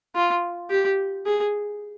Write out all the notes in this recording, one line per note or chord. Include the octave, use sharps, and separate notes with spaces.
F4
G4
G#4